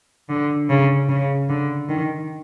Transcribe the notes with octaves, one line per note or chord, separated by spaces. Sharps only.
D3
C#3
C#3
D3
D#3